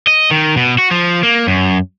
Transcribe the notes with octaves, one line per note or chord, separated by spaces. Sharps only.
D#5
D#3
B2
F#4
F3
A#3
F#2